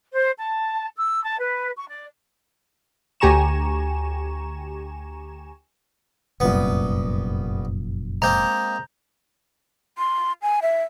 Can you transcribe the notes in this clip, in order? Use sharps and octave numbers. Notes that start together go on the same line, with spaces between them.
C5
A5
E6
A5
B4
C#6
D5
D2 G4 G#5 A#5 C#6 E7
F1 C2 F#2 A#2 B3
G#3 A#3 C4 A#5 G6
C6
G#5
E5